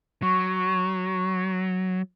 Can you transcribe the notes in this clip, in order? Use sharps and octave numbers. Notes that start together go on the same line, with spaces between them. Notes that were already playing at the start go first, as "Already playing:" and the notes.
F#3 C#6